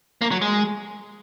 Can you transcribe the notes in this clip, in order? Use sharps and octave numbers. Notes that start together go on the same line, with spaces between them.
A#3
F#3
G#3